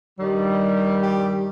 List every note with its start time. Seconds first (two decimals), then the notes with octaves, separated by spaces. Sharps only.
0.18 G2 D#3 G3
1.01 G4